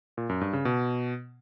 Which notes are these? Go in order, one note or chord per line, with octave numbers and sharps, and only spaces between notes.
A#2
F#2
G2
C#3
B2